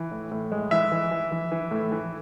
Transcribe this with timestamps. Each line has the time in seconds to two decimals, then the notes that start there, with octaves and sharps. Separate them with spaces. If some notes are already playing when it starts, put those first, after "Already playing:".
Already playing: E3
0.11 A2
0.31 A2
0.52 G#3
0.71 E3 E5
0.92 E3
1.11 E3
1.32 E3
1.52 E3
1.71 A2
1.92 E3